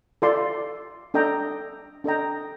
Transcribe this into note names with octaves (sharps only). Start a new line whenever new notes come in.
F4 A4 D5 A5 C6
D4 A4 D#5 G5 A#5
D4 A4 D#5 G5 A#5